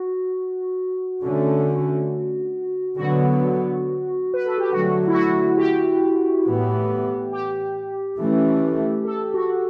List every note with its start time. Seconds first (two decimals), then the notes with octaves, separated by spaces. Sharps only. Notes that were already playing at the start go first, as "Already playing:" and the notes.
Already playing: F#4
1.23 D3 A3 C#4
2.97 D3 F#3 B3 F#4
4.34 B4
4.46 A4
4.58 G4
4.71 D3 F#3 A3 F#4
5.08 E4
5.14 F#4
5.57 G4
6.45 A2 E3 B3
7.32 G4
8.19 E3 A3 C#4
9.05 A4
9.34 F#4